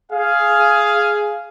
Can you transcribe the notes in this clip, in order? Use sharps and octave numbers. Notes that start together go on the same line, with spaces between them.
G#4 F5